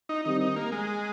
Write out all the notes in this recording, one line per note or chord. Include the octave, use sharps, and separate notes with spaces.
D#4
D#3 G3 C4 D#4 G4
D#4
A#3
G#3